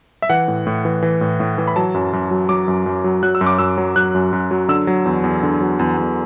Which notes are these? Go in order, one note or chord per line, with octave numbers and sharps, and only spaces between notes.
E5
E3 F#5
A2
A2
E3
E3
A2
A2
E3
B5
F#3 A5
F#2
F#2
F#3
F#3 D6
F#2
F#2
F#3
F#3 F#6
E6
F#2
D6
F#2 E6
F#3
F#3 F#6
F#2
F#2
F#3
D3 E6
F#3
E2
E2
D3
F#3
E2
E2